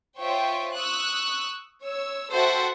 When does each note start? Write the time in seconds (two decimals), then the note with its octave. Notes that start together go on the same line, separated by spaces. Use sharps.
0.20 F4 C5 C#5 E5 G5 C#6
0.76 C#6 D#6 E6 F#6
1.84 C#5 E6
2.33 F#4 A4 C5 E5 F#5 G5